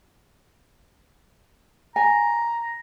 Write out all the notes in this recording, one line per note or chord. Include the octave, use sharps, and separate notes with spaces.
G#5 A#5